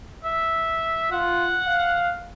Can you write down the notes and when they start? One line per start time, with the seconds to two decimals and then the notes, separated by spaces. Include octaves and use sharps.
0.25 E5
1.12 F4 F#5
1.67 F5